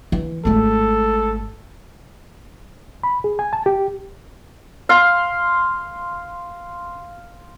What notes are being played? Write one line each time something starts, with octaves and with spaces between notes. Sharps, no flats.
E3
G#1 A3 A4
B5
G#4
G#5
A5
G4
F5 C6